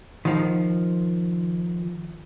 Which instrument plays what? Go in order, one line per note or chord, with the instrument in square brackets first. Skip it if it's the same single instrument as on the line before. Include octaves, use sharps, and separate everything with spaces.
[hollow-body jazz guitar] D#3 F3